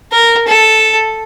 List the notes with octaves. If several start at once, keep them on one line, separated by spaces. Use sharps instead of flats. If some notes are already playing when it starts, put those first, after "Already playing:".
A#4
A4